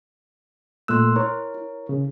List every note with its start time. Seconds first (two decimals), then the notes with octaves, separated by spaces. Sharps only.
0.88 A#2 A3 C6 E6 F#6
1.16 E4 A#4 C#5
1.54 E4
1.89 C#3